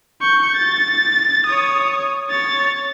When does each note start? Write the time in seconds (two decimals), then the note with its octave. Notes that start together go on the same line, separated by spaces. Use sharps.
0.21 C#6 G6
0.55 A6
1.46 C#5 D#6
2.29 C#5 A6